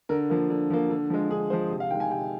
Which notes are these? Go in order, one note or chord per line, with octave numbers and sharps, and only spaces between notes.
D3 A#4
F3 A#3
D3
F3 A#3
D3
F3 G#3
D3 G#4
F3 G#3 C5
C3
F5
D#3 G#3 G5
G#5
C3 G5